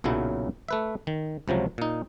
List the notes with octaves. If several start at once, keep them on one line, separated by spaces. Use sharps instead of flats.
B1 A#2 C#3 F#3 E4
A3 B4 E5
D#3
C#2 C3 F3 F#3
A#2 D#4